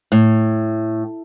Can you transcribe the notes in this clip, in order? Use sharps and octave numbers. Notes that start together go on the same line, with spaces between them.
A2